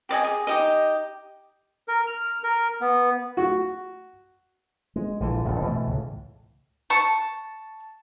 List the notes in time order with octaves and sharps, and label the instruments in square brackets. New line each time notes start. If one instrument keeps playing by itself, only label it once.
[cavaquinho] G4 D5 D#5 G#5
G#4
D#4 G4 D#5
[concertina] A#4
F6
A#4
B3
[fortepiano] F#4
[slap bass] G#3
A#1 D3 E3
F1 A#1 F#2 A#2
B2 E3 A3
C#2 A2
[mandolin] A5 C#6